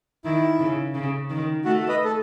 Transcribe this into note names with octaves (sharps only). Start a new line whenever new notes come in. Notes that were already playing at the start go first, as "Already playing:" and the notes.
D#3 E4
C#3
C#3
D#3
A3 F#4
B4 D#5
A4